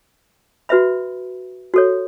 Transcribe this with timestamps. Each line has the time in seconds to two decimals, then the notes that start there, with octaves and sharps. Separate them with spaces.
0.69 F#4 B4 E5 B5
1.74 F#4 A4 C#5